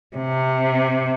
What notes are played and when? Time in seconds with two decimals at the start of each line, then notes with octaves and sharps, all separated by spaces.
0.16 C3